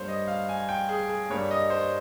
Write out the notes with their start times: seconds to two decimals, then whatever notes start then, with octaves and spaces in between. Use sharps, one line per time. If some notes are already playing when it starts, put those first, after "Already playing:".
Already playing: G2 G3 A#3 C5 C#5
0.08 D#5
0.28 F5
0.49 G#5
0.69 G5
0.89 G#4
1.09 G#4
1.30 G2 G3 A#3 C#5
1.51 D#5
1.70 C5